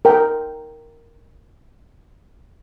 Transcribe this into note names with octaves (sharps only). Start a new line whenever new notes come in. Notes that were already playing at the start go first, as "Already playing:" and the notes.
A#4 G5